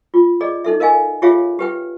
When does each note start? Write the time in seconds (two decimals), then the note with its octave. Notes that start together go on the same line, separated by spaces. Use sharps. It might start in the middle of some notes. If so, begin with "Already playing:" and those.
0.14 F4
0.41 G#4 D5 D#5
0.64 D#4 A4 E5
0.80 A#4 D#5 F5 G#5
1.22 F4 G4 G#4 C#5 E5 F5
1.59 G4 B4 G5